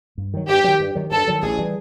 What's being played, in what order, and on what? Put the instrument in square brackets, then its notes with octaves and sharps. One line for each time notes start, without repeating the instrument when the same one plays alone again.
[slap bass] G2
D#3 F#3
[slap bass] G2 [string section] G4
[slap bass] D#3 F#3
G2
D#3 F#3
[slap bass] G2 [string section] A4
[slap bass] D#3 F#3
[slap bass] A1 [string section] G#4
[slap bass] E3 G3